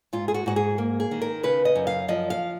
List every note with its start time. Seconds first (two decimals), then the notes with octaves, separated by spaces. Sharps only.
0.13 G#2 F4
0.28 G#4
0.34 F#4
0.46 G#2 F#4
0.56 G#4
0.78 A#3
1.00 G#4
1.11 D#3
1.22 A#4
1.43 C#3 B4
1.65 D#5
1.76 F#2
1.87 F5
2.08 F3 D#5
2.30 F5